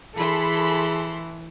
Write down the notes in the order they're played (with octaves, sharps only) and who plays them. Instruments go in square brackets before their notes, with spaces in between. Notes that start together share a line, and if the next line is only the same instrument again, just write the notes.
[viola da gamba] E3 [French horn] G#4 [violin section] A4 B5 C6